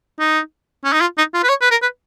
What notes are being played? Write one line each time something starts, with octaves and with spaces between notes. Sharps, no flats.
D#4
C#4
D#4
F4
D#4
F4
B4
C#5
B4
A#4
B4